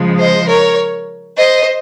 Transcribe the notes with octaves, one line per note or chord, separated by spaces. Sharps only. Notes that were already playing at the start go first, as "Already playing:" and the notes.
Already playing: C#3 F3 G#3
C5 D#5
A#4 C#5
C5 D#5